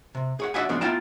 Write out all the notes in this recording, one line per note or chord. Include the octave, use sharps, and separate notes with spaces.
C3
G#4 C#5 F#5
D4 F#4 D#5 E5 F#5 G#5
F3 G#3 B3 C#4 D4
B3 E4 F4 G5 A5 A#5